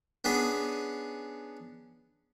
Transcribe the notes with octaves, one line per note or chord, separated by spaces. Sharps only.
B3 C#4 D4 G#4 B4